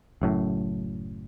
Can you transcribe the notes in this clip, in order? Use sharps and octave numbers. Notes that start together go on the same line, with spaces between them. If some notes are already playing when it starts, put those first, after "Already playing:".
F#1 F#2 A2